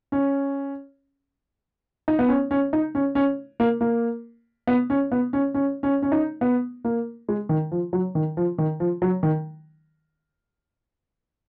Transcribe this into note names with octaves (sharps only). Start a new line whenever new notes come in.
C#4
D#4
B3
C#4
C#4
D#4
C#4
C#4
A#3
A#3
B3
C#4
B3
C#4
C#4
C#4
C#4
D#4
B3
A#3
G#3
D#3
F3
F#3
D#3
F3
D#3
F3
F#3
D#3